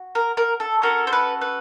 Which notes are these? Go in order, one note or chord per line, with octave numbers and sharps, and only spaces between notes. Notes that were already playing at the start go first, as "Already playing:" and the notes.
Already playing: F#4
A#4
A#4
A4
C#4 F#4 A4 A#4
C5
B4
B4